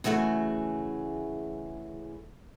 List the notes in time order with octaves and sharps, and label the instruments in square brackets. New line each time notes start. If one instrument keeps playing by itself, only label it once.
[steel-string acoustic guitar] C#3 E3 A3 F#4 G#4